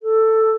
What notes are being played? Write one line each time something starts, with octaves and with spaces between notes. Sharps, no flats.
A4